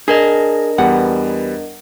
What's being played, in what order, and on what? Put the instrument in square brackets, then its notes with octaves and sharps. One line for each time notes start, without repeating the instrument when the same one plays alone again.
[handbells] D4 A#4 D#5 [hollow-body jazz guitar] G#4
[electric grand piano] E2 G3 B3 [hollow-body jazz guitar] F#5